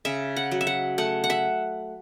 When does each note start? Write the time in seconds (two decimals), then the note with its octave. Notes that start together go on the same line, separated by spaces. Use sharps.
0.05 C#3 E5
0.37 F#5
0.51 F#3
0.61 E5
0.67 F#5
0.98 A3 F#5
1.24 F#5
1.30 E5